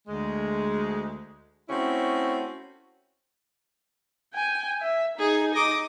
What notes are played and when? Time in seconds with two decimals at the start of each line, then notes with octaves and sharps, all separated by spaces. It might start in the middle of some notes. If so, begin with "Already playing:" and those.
0.08 D2 G#3
1.69 A3 C4 C#4 E4 F#4
4.34 G5 G#5
4.82 E5
5.19 D#4 G#4
5.54 D#5 D6